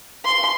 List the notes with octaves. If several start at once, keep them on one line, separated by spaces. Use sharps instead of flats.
C6